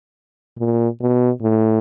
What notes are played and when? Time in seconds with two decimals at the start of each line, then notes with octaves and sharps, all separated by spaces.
0.59 A#2
1.01 B2
1.42 A2